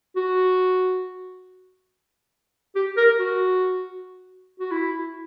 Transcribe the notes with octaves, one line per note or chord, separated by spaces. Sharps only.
F#4
G4
A#4
F#4
F#4
E4